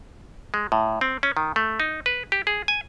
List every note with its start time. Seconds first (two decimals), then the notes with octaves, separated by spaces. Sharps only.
0.54 G#3
0.72 A2
1.01 C4
1.23 C#4
1.37 D#3
1.56 A3
1.80 D#4
2.06 B4
2.32 G4
2.47 G#4
2.68 G#5